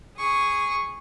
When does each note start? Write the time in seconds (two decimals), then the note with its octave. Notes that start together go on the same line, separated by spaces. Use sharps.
0.17 G#4 C#6